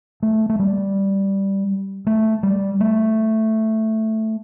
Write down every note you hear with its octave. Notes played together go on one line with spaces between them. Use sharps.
A3
A3
G3
A3
G3
A3